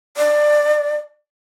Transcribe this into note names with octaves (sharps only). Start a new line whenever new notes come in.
D5